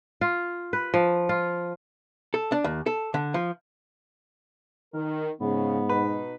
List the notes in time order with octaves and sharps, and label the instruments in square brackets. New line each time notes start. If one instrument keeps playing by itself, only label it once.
[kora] F4
B4
F3
F4
[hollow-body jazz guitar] A4
D4
D#2
A4
D3
F3
[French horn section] D#3 [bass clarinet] A#4
[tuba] G#2 [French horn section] C#3 [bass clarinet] B3
[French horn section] B2 D#4 [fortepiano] B4